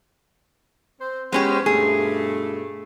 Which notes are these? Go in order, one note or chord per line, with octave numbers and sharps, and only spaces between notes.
C4 C5
G#3 B3 C#4 G4 G#4 C5
G2 B2 A3 G#4